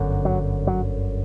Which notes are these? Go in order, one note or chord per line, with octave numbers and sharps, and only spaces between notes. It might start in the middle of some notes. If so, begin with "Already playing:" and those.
Already playing: G1 F#2 D3
F#3
F#3